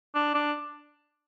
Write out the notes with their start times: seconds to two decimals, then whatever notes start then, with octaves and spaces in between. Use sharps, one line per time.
0.15 D4
0.34 D4